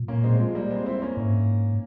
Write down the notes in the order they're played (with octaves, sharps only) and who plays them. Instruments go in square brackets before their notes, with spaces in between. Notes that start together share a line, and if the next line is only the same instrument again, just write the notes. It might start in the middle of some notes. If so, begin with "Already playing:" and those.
Already playing: [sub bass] A#2
[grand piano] A#3 C#4
G#3 C4
F3 G#3
G3 A#3
G#3 C4
C4 E4
A#3 C#4
[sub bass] G#2